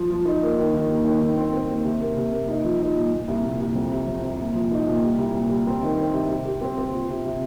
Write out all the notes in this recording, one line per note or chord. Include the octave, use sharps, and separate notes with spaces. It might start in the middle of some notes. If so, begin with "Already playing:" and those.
Already playing: F3
F3
D#4
A#3
D#3
D#3
D#2
D#3
D#3
C4
C4
D#2
C3
A#3
C3
A#3
D#4
F3
D#4
A#2
A#2
C2
A#2
C2
F2
C3
F2
C3
A#2
F3
D#4
A#2
G3
C2
A#2
G3
C4
D#3
C4
C3
G4
G4
C4
C4
F4
C3
C3